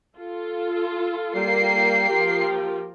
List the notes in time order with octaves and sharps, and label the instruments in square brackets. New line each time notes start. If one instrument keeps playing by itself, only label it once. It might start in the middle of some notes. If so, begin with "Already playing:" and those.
[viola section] F4 A4
[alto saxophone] G3 [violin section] A#3 G5 C7
[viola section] F3 F4 A#4 [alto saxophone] G4